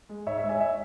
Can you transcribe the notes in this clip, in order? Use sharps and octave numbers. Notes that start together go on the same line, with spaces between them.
G#3
G#2 C#5 E5
C#5 E5
G#3
E5 G#5
C#5 E5